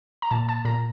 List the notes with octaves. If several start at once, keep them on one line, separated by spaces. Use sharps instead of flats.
A#5
A#2 A5
A5
A#2 A#5